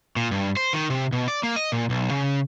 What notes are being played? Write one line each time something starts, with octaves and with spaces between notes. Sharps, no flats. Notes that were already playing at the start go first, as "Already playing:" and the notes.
A#2
G2
C5
D#3
C3
B2
D5
A#3
D#5
A#2
B1
C#3